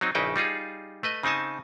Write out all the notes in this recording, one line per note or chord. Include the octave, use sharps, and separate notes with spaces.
F#3 C4 D#4
A#1 C#3 D#4 E4 B4 G5
G3 D#4 F4 G#4
A3 B4 D#5
C#3 C4 D#4 G#5 A5